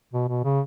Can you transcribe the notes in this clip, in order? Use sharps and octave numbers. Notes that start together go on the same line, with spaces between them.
B2
B2
C#3